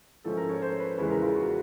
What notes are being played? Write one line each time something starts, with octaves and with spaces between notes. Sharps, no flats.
G#2 F3 A3 C#4 A4
A#4
C#5
C5
B4
E2 C#3 E3 G#3 C#4 B4
A#4
F4
F#4